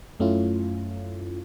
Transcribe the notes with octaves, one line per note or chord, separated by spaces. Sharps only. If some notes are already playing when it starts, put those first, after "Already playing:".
F#2 A3 C#4 E4 F4